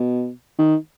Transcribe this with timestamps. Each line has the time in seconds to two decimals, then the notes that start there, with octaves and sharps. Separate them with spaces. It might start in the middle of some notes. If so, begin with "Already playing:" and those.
Already playing: B2
0.59 D#3